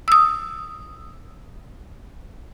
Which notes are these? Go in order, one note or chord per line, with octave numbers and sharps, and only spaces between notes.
D#6 E6